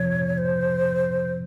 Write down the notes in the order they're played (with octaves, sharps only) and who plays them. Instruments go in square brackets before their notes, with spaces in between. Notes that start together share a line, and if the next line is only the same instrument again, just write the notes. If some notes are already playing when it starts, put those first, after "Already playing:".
Already playing: [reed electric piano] F2 C3 F3 [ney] C#5
[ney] C5